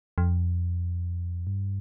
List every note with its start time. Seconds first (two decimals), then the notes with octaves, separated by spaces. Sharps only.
0.18 F2
1.47 G2